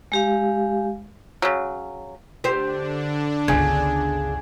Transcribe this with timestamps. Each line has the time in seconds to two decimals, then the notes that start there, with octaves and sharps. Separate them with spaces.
0.12 G#3 G4 F5
1.42 C#3 F#3
2.44 D3 D4 G4 C5
3.48 G1 C#2 C#3 G#5 G#6